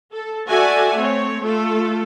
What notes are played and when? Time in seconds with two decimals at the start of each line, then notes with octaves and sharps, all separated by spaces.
0.12 A4
0.49 F#4 A4 D5 E5 F#5 G#5
0.97 A3 C4 C#5
1.42 A3 F4 A4